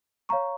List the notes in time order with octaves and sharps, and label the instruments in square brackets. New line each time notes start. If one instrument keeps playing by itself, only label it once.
[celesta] C#5 F5 A#5 C#6